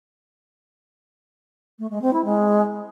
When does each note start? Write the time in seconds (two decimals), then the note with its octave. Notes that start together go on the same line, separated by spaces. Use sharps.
1.79 A3
1.90 G#3
2.02 C4
2.13 E4
2.24 G#3